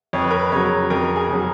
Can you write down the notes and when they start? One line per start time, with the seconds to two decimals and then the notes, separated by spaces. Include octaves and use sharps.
0.13 F2 C#5
0.22 B4
0.30 A#4
0.39 B4
0.52 C#3 F#3 C#5
0.90 F2 A#4
1.16 G#4
1.29 C#3 F#3